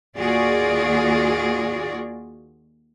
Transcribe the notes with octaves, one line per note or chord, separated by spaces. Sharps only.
D#2 F4 F#4 G#4 D5